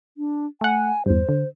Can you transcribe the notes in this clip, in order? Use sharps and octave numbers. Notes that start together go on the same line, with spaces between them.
D4
A3 F#5 G#5
E2 G2 C5
D3